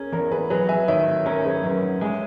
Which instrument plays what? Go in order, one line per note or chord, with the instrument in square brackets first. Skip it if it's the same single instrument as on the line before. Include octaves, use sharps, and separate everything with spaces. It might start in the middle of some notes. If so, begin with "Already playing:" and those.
Already playing: [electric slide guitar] C#4 [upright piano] G#4 A#4
[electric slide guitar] E2 [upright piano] A#4
[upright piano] G#4 B4
[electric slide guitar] F#3 [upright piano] G#4 B4
[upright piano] E5 G#5
[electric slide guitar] D#3 [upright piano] C#5 E5
[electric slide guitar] C#4 [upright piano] A#4
[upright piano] G#4 B4
[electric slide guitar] F#2 [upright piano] A#4 C#5
[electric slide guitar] G#3 [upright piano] E5 G#5